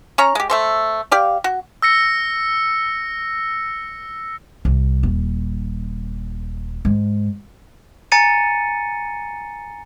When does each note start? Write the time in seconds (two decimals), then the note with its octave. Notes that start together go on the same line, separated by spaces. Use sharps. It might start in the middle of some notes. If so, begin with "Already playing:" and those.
0.18 C#4 C#5 A#5
0.35 G#3 G4
0.50 A3 A4 C5
1.12 G4 D5 F5
1.44 F#4
1.82 E6 A#6 C#7
4.65 C2
5.03 D#1
6.85 G#2
8.12 G#5 A#5 A6 C#7 D#7